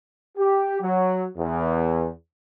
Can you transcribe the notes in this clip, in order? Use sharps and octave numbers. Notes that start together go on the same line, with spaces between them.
G4
F#3
E2